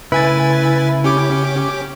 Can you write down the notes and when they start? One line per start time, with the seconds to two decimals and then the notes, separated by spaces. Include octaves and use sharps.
0.12 C#3 A3 E4 B4 G#5 A6
1.04 C#4 G4 D6